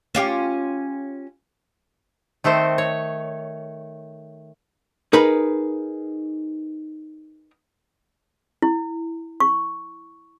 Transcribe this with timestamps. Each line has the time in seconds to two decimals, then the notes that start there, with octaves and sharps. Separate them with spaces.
0.15 C#4 F4 G4
2.44 D#3 A3 C4 C5
2.78 C#5
5.13 D#4 G#4 A#4 B4 B5
8.62 E4
9.40 C#6